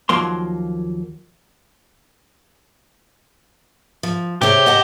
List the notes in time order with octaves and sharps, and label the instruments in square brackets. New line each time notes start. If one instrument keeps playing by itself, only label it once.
[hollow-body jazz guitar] D#2 F3 F#3 A#3 C6
[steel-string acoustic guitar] F3
[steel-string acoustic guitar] C3 G#4 C#5 [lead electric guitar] G4
[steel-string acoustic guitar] D#5 F#5 A5